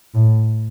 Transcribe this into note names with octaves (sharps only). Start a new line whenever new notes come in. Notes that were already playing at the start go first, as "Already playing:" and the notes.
A2